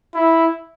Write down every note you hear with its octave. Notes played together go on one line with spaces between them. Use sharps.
E4